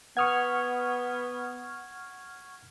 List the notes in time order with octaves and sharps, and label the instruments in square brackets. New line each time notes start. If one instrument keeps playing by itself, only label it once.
[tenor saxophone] B3 [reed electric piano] F#5 D#6 [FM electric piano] C#6 F6 G#6